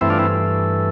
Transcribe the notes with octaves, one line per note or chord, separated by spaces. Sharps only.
G2 E3 A3 C4 E4
D4 F4
C4 E4